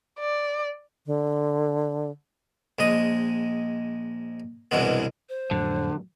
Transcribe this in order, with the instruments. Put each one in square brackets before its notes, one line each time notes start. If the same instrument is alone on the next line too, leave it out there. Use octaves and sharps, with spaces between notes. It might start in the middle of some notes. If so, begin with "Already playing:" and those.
[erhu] D5
[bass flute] D3
[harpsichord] A#1 G#3 D#5 D#6
C2 G2 B2 E3 G#3 B3
[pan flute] C5
[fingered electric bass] F2 A2 F#3 [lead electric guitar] D3